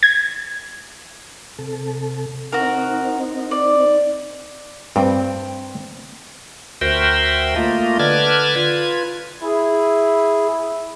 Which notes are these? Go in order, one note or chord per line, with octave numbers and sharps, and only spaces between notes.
G#6
C3 A4
C4 D#4 F#4 A#4
D5
G2 C4
D2 F#4 A#4 C5 E5 G5
A3 A#3 F4 D#5
D3 B4 D5 A5 F6 G#6
F4 B4 G#6
E4 G#4